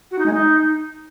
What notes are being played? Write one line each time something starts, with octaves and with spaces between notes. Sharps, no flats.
F#4
D#4
G#3
D#4